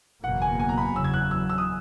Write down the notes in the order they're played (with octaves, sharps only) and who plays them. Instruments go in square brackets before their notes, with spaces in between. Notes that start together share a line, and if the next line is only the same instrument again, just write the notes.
[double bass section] F#1 E2 B2 A#3 [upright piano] F#5
[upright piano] G#5
G#5
A#5
B5
[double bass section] F#1 E2 C#3 F#3 [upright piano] E6
[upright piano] G#6
F#6
E6
E6
D#6